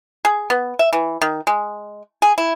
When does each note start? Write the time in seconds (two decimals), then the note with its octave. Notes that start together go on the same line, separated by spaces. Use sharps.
0.25 G#4
0.50 B3
0.79 E5
0.93 E3
1.22 D#3
1.47 G#3
2.22 G#4
2.38 E4